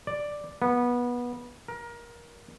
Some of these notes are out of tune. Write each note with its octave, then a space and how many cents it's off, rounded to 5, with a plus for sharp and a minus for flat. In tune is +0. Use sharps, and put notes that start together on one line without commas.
D5 +5
B3 -20
A#4 +20